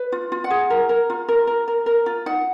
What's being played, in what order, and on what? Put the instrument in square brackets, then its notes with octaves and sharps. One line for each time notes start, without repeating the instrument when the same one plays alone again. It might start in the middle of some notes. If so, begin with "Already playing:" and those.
Already playing: [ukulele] B4
F4
F4
F#5
G#4
A#4
A#4
F4
A#4
A#4
A#4
A#4
F4
D#4 F#5